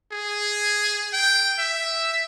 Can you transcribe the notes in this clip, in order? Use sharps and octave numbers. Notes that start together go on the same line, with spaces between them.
G#4
G5
E5